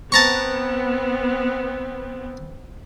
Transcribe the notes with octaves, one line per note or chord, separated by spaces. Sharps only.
B3 C4 A5 A#5 C#6